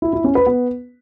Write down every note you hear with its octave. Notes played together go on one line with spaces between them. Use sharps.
E4
E4
C#4
B4
B3